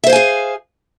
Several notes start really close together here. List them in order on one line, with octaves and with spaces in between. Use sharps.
E5 C5 F5 G#5 G#4